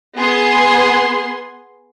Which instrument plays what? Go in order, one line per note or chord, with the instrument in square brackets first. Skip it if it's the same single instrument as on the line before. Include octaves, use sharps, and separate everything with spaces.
[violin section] B3 G#4 C6